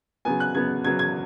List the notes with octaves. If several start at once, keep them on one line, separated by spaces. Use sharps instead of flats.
C#3 F#3 B3 G#5
F#6
C#3 F#3 B3 G#6
C#3 F#3 B3 G#6
G#6